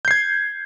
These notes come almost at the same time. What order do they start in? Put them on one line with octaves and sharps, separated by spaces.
G6 C7 G#6